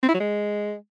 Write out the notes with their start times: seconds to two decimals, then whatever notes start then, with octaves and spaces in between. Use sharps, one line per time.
0.03 C4
0.08 E4
0.14 F#3
0.20 G#3